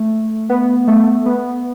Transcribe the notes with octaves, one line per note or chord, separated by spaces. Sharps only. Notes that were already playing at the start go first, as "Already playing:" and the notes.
Already playing: A3
B3
A3
B3